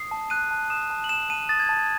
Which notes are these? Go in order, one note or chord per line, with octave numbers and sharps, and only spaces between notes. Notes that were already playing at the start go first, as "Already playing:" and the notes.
Already playing: D#6 C7
A5
F#6 D#7
A5
D#6 E7
A5
F#7
F#6 E7
A5 D#7
D#6 A6
G#6
A5
G#6